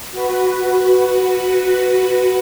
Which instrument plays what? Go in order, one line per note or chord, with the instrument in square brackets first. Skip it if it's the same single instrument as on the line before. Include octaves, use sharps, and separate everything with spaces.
[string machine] F#4 B4